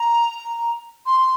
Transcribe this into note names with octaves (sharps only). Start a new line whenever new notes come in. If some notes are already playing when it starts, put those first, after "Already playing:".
Already playing: A#5
C6